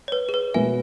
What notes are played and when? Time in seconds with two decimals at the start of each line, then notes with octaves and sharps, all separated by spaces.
0.08 C#5
0.12 B4
0.29 G#4
0.34 B4
0.54 B2 G#3 B3 E5 G#5